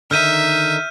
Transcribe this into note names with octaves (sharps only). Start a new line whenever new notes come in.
D3 D#3 D#4 E5 F6 G6 D#7